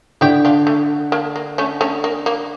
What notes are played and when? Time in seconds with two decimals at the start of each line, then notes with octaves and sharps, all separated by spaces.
0.21 D3 E4 G4
0.45 D4 F4
0.67 A3
1.12 A#3 D4
1.36 A#3
1.58 A3 C#4
1.81 A3 C#4
2.04 A#3
2.26 A#3